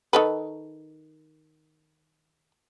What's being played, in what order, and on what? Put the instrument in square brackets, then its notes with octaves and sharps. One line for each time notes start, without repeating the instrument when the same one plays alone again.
[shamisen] D#3 A4 B4